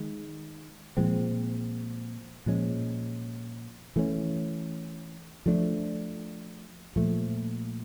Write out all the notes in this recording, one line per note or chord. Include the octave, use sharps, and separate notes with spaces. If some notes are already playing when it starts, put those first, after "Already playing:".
Already playing: D#3 G#3
A#2 F3 G#3 C4
A#2 F3 G#3 C#4
E3 A3 C#4
F3 A3 D4
A#2 F3 A3